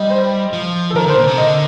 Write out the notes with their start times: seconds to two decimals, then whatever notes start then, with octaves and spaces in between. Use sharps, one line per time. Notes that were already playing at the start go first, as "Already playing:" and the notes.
Already playing: G3 D#5
0.10 C5
0.53 F3
0.90 A4
0.95 D#3 A#4
1.06 D3 C5
1.17 A#2
1.27 C3
1.38 D3 D#5